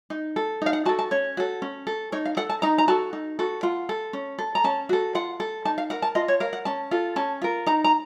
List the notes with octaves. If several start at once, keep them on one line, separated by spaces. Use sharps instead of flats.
D#4
A4
D#4 F5
F#5
F#4 A4 A5
A5
C#4 C#5
F#4 A4
C#4
A4
D#4 C#5
F5
A4 F#5
A5
D#4 A#5
A#5
F#4 A4 A5
D#4
F#4 A4
F4 F#5
A4
C#4
A4
A#5
C#4 A5
F#4 A4
F4 F#5
A4
D#4 A5
F5
A#4 F#5
A5
F4 D#5
C#5
A#4 F5
F#5
C#4 A5
F4 A4
C#4 A5
F4 A#4
D#4 A#5
A#5